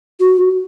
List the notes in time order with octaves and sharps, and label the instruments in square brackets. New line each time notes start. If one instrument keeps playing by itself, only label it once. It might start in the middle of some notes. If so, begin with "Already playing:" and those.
[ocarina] F#4